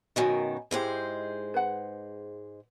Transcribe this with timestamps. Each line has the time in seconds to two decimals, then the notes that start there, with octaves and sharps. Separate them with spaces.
0.16 F#2 B2 D#3 D#5 G#5
0.71 G#2 G#3 E4 G4 C5
1.54 B4 F#5